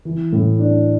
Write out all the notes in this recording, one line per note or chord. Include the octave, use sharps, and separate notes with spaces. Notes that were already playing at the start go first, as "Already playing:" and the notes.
E3
A2
D4